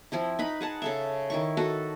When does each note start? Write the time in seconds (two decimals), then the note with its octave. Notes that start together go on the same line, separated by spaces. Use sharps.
0.12 F3 C4 E4
0.39 D#4 B4 B5
0.61 G#4 F#5 A5
0.82 C#3 A4 E5
1.30 D#3 E4 C#6
1.57 F#4 A4 B4